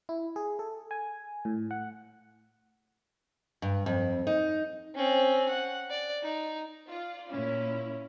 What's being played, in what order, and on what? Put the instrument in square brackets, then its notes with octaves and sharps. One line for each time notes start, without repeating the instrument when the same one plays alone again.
[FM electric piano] E4
G#4
A4
G#5
A2
F#5
[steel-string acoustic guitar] G2
F2
D#4
[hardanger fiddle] C4 C#4
F#5
D5
D#4
[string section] F4 D5
[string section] A#2 E4 [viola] C#4